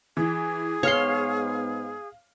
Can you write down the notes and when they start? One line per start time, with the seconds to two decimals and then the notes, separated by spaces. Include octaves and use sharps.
0.17 E3 G#4
0.83 G#2 B3 C#5 F5 C6 F6 C7